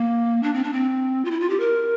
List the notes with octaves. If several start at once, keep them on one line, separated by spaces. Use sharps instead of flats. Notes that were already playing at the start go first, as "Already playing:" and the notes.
Already playing: A#3
D4
C4
D4
C4
F4
E4
F4
G4
A#4